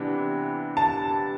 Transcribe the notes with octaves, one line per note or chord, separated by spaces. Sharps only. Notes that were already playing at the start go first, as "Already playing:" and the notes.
Already playing: C3 E3 B3 D4
A5